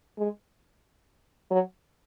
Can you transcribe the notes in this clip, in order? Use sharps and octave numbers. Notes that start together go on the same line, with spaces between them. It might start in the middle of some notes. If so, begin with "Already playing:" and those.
G#3
F#3